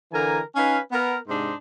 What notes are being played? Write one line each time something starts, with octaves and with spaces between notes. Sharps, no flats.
D3 E3 A#4 G#5 A#5
C#4 D#4 B4 F5 G#5
B3 A#4
G#2 C3 D4 D#4 C6